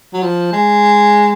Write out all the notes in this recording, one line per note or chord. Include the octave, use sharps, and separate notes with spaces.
F#3
F3
G#3